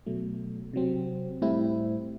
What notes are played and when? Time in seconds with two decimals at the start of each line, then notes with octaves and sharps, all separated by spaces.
0.06 B2 F#3 A3
0.73 C3 F#3 C4
1.42 A2 G3 C4 E4